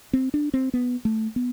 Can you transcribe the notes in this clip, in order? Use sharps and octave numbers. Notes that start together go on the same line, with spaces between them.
C4
D4
C4
B3
A3
B3